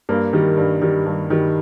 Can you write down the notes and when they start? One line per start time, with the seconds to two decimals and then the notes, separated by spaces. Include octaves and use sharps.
0.09 G2 A#3
0.33 D#3 G3
0.57 G2
0.82 D#3 G3
1.06 G2
1.30 D#3 G3